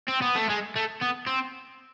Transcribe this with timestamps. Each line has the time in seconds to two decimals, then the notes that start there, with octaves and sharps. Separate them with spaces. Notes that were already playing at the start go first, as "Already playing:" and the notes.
0.08 C4
0.22 B3
0.36 A3
0.50 G#3
0.76 A3
1.01 B3
1.27 C4